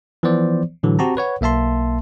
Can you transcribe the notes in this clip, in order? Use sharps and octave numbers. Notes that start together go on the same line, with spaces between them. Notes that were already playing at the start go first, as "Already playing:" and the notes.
E3 F3 B3 C5 D5
A2 D3 E3 F#3
C4 F#4 G4 A5 A#5
B4 C#5 F#5
B1 A#3 E5 A5 C6